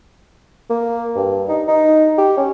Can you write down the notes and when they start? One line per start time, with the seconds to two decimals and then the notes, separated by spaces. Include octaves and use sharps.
0.70 A#3
1.15 G2
1.49 D#4
1.68 D#4
2.18 G4
2.37 C#4